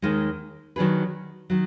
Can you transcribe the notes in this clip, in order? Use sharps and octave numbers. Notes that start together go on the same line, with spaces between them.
D#2 D#3 G#3
D#3 F#3 D4 G#4 B4
D#3 F#3